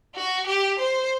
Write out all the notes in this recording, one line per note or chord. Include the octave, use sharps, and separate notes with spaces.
F#4
G4
C5